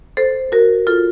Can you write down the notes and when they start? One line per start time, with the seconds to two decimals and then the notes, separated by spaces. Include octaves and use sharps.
0.17 A4 C5
0.52 F#4 A#4
0.87 F4 A4